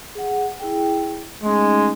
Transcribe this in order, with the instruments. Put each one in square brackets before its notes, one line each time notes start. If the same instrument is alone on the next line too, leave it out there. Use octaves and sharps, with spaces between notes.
[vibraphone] G#4 F#5
E4 G#4 G5
[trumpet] G#3 [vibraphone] A3 C#4 D#4